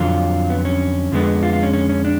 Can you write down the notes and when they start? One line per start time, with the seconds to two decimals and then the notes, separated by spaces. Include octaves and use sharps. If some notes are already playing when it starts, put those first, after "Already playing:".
Already playing: F2 D3 F#3 F4
0.50 B3
0.65 C#4
1.12 F2 D3 G#3 B3
1.43 F4
1.53 F4
1.63 C#4
1.73 C#4
1.89 C#4
2.05 D4